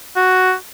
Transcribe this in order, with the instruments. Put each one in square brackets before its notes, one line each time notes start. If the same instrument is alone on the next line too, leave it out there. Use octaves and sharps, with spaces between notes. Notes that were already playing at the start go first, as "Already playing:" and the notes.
[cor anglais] F#4